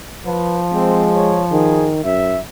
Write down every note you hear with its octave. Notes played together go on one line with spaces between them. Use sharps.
F3 B4
G#3 C4
C#5
D#3 G#4
F#2 E5